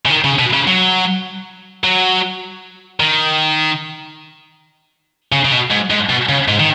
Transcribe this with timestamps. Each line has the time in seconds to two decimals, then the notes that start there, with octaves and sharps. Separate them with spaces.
0.06 C#3
0.10 D#3
0.24 C#3
0.39 B2
0.54 C#3
0.68 F#3
1.84 F#3
3.00 D#3
5.32 C#3
5.45 C#3
5.52 B2
5.71 G#2
5.90 G#2
6.10 B2
6.29 C#3
6.48 G#2
6.60 D#3